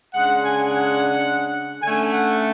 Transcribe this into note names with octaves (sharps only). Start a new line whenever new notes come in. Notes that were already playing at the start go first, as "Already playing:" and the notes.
C#3 G#3 D4 F#5
G#5
F#5
D3 A3 C#4 G#5
F#5